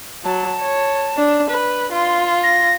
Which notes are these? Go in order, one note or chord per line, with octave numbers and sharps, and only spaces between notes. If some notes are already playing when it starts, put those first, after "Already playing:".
F#3 A5
C#5
D4
B4
F4 C6
A#6